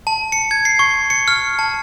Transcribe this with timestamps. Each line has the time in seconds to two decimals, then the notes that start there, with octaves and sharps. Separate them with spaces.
0.07 A5
0.32 C#7
0.51 G#6
0.65 C7
0.79 C#6
1.10 C#7
1.28 F6
1.59 A5